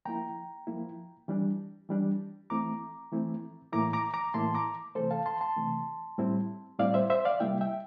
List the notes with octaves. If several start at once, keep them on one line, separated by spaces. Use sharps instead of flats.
F3 A#3 E4 G5 A#5
F3 A#3 E4
E3 G3 D4
E3 G3 D4
E3 A3 C4 E4 A#5 D6
E3 A3 C4 E4
A2 E3 A#3 E4 A#5 D6
A#5 D6
A#5 D6
A2 E3 A#3 E4 A5 C6
A#5 D6
C3 E3 A3 A4 C5
F5 A5
A5 C6
A5 C6
C3 E3 A3
A2 G3 C4 E4
A2 G3 C4 E4 D5 F5
C5 E5
C5 E5
D5 F5
C3 G3 A#3 E4 E5 G5
E5 G5